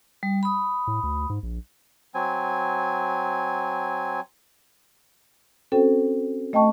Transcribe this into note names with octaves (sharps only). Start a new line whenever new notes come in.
G3
B5 D#6
A2
D2
G#2
A#1
F#3 C4 G#5
C4 C#4 F#4 A4 C5 G5
A3 D#5 G5 A5 C#6